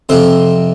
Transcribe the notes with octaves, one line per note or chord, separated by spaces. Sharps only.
F2 C3 F3 C5